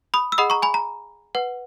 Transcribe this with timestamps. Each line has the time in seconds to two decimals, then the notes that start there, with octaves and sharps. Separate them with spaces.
0.14 B5 D#6
0.32 E6
0.38 G#4 D#5 F#5 B5 D#6
0.50 A#5 C#6
0.62 G#5 B5
0.74 A#5
1.35 B4 F#5